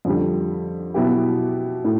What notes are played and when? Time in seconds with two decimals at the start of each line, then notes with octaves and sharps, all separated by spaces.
0.05 F2 D3 G3
0.94 B2 F#3 B3 E4 G4
1.84 A2